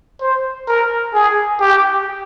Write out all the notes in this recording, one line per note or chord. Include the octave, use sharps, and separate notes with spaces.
C5
A#4
G#4
G4